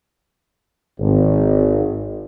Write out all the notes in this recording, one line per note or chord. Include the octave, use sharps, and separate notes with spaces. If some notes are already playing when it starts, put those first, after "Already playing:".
G#1